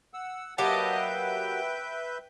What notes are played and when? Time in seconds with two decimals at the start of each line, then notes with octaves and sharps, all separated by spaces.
0.14 F#5 E6
0.58 F#3 A#3 G4 B4 D#5 E5 A5 G6
0.98 G5